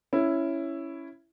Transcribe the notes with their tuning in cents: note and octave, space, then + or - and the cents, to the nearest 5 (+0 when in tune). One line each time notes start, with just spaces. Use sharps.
C#4 +0 E4 +5